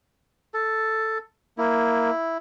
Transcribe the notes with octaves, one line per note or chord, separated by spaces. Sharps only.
A4
A#3 E4